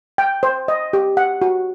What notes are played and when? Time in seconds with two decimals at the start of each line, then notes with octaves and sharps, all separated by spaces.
0.18 G5
0.43 C5
0.68 D#5
0.93 G4
1.17 F#5
1.42 F#4